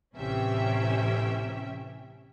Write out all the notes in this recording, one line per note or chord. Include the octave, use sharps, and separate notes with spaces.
A1 C3 E3 C#4 E5 G5